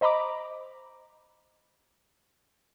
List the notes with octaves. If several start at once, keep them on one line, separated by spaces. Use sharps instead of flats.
C5 D#5 A#5 B5 D6